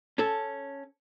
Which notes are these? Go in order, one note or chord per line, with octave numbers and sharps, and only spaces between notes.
C#4 A4